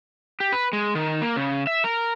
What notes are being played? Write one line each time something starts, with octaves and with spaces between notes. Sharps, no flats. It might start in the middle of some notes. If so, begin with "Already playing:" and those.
G4
B4
G#3
D#3
A#3
C#3
E5
A#4